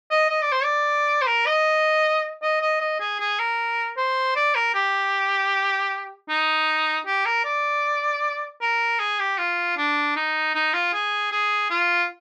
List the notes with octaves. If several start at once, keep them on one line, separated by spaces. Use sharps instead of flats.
D#5
D#5
D5
C5
D5
C5
A#4
D#5
D#5
D#5
D#5
G#4
G#4
A#4
C5
D5
A#4
G4
D#4
G4
A#4
D5
A#4
G#4
G4
F4
D4
D#4
D#4
F4
G#4
G#4
F4